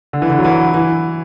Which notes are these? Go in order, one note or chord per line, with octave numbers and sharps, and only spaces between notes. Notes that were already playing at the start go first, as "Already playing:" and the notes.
D3
E3
D3
F#3
E3
E3